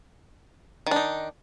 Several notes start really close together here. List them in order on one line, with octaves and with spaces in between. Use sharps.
D#3 D4 D#4